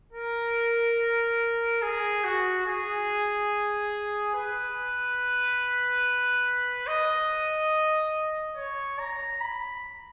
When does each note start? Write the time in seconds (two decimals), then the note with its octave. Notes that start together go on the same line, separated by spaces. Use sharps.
0.13 A#4
1.82 G#4
2.24 F#4
2.66 G#4
4.35 B4
6.87 D#5
8.57 C#5
8.99 A#5
9.41 B5